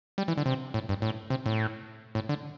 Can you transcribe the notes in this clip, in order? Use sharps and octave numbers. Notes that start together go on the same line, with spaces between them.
G3
E3
D3
C3
A2
G2
A2
C3
A2
A2
D3